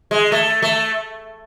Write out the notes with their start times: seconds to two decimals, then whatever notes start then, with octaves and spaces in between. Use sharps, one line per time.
0.11 G#3
0.32 A3
0.62 A3